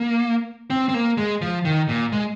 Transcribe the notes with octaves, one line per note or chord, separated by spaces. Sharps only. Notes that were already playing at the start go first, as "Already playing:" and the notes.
Already playing: A#3
C4
C4
A#3
G#3
F3
D#3
A#2
G#3